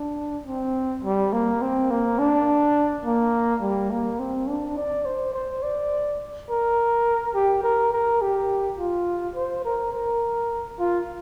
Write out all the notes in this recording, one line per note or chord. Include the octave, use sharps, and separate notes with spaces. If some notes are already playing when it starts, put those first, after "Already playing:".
Already playing: D4
C4
G3
A#3
C4
A#3
D4
A#3
G3
A#3
C4
D4
D5
C5
C5
D5
A#4
G4
A#4
A#4
G4
F4
C5
A#4
A#4
F4